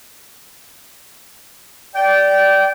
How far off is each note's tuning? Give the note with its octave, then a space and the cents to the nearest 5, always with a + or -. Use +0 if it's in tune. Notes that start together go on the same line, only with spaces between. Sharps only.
D5 -10 G5 -20